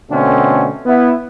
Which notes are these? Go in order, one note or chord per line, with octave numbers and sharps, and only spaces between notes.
B2 D3 A3 C4 C#4
B3 E4